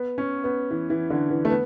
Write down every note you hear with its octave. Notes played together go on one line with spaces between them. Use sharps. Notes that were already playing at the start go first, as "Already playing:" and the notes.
Already playing: B3
C#4
B3
E3
E3
D3
E3
A3
B3